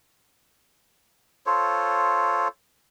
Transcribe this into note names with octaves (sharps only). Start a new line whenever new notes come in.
F4 A4 C5 C#5